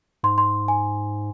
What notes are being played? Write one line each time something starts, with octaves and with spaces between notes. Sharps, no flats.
G#2 C6
C6
G#5